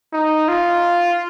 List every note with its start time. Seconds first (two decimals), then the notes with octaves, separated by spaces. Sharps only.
0.13 D#4
0.48 F4